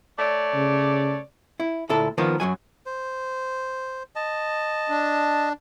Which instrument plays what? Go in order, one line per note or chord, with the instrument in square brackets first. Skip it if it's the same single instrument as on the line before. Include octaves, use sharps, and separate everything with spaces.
[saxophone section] A3 C#5 D5
[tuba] C#3
[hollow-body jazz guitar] E4
D2 A#2 E4 A4
D#3 F3 A#3 B3
F#2 C#3 F#3 G#5
[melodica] C5
D#5 A5
[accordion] D4